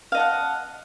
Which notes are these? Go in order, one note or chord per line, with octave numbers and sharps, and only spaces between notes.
D#5 F5 F#5 A5